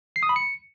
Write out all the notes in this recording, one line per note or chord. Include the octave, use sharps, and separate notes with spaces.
C7
D#6
B5
C#7